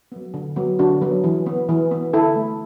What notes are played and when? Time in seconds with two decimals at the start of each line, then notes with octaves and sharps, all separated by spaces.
0.12 F#3 B3
0.34 D3
0.56 F#3 B3
0.79 D3 D4 F#4
1.01 F#3 B3
1.24 E3
1.46 B3
1.69 E3
1.91 B3
2.13 D3 E4 A4
2.36 A3